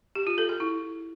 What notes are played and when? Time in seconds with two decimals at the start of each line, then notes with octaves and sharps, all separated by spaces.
0.15 G4
0.27 F4
0.38 A4
0.49 G#4
0.60 E4